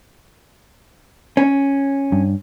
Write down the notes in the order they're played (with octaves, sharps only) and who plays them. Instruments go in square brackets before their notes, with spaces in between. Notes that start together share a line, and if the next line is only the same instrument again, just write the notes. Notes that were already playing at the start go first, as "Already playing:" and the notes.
[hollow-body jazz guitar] C#4
[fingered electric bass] G2